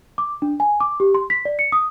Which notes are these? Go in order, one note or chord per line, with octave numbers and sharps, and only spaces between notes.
D6
D4
G#5
D6
G4
C6
B6
D5
C#7
D#6